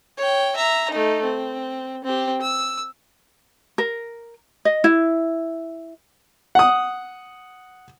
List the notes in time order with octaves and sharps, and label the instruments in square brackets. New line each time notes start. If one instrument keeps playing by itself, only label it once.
[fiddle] C#5 G5
E5 A#5
A3 D#4
C4
C4 G4
E6
[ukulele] A#4
D#5
E4
[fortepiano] F#5 D#6